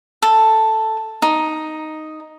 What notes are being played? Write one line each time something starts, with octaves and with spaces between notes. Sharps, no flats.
A4
D#4